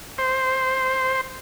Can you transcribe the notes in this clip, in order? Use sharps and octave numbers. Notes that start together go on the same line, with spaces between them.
C5